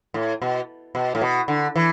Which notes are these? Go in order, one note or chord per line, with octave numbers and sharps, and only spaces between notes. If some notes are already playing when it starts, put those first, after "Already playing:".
A2
B2
B2
A2
B2
D3
E3